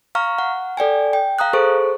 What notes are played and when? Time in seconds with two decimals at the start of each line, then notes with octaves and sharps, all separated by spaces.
0.15 F5 A#5 C#6 F6
0.38 F#5
0.77 A4 D5 G5 G#5
1.13 G5
1.39 F5 A#5 D#6 F#6
1.53 G#4 A4 C5 C#6